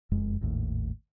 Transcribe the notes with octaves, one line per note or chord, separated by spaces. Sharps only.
F1 F#2 G#3
G#1 D#2 A2